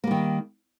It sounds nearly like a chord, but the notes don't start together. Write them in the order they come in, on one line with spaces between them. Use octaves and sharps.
A#3 G3 D#3